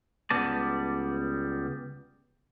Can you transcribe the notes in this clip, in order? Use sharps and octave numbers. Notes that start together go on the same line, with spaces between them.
C#2 G3 B3 D5 A5